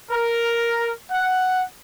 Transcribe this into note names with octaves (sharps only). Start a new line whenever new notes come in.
A#4
F#5